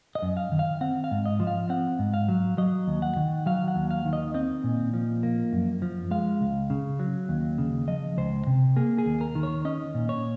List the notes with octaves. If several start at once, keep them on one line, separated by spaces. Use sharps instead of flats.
D#5
F#2
F5
D#3
F5
C4 F#5
F5
G#2
D#5
F3
F5
C4 F#5
G#2
F5
F#3
F#3 D#5
D#2
F#5
D#3
F#3 F5
F#5
D#2
F5
D#3
D#5
C4 D#5
A#2
F3
A#3
F#2
F3
G#3 F5
C#2
C#3
F#3
D#2
C#3
F3 D#5
C#2 C5
C3
A#3 G#4
G#4
D#2
A#4
D#3
C#5
C#4 D#5
A#2
C#5